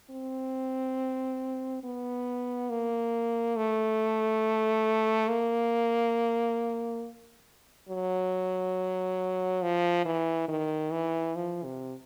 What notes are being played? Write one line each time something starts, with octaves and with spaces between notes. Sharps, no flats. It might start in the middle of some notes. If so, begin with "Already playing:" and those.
C4
B3
A#3
A3
A#3
F#3
F3
E3
D#3
E3
F3
C3